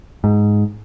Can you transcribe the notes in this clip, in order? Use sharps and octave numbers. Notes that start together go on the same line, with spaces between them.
G#2